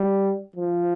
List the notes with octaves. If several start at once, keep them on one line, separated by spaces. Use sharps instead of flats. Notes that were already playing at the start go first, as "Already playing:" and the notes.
Already playing: G3
F3